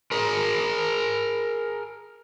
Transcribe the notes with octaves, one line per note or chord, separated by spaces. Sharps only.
G#4 A#4